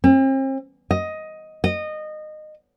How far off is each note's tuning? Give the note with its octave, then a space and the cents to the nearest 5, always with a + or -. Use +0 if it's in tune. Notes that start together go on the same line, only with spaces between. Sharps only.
C4 +40
D#5 +10
D#5 -20